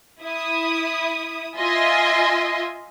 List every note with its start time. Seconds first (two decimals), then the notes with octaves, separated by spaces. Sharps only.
0.23 E4 D#6
1.58 F4 D#5 E5 G#5 C6